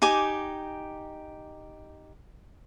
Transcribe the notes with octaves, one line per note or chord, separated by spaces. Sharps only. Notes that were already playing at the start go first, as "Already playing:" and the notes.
D#4 G4 G#5 D6